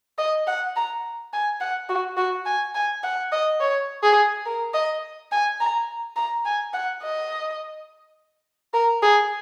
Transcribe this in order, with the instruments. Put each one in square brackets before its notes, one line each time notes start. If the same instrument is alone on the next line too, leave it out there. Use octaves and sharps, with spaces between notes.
[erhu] D#5
F#5
A#5
G#5
F#5
F#4
F#4
G#5
G#5
F#5
D#5
C#5
G#4
A#4
D#5
G#5
A#5
A#5
G#5
F#5
D#5
A#4
G#4